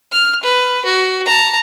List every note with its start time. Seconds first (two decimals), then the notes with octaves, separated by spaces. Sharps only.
0.12 F6
0.43 B4
0.85 F#4
1.25 A5 A#5